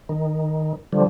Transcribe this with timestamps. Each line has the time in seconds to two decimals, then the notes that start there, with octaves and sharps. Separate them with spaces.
0.09 D#3
0.93 D3 F3 G3